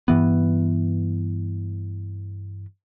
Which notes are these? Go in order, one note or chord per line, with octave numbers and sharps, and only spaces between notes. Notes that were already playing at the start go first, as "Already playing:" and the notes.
G2 E3 B3